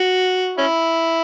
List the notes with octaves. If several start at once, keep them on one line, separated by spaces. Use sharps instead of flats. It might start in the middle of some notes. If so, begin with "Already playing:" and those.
Already playing: F#4
C#4 E4